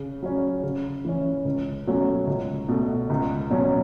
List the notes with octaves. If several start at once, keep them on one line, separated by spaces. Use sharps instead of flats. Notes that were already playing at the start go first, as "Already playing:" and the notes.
Already playing: C#3
F#3 C#4
C#3
E3 C#4
C#2
B2 F#3 A3 C#4
C#2
B2 A3
C#2
B2 F#3 C#4